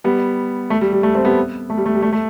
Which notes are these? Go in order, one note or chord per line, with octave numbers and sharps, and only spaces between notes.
G3 B3
A3
G3
G3
A3
A3 C4
G3 B3
A3
G3
A3
G3
A3
A3